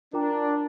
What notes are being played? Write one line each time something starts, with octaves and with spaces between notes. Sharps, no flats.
D4 F4 A#4 G5 A#5 D6
D5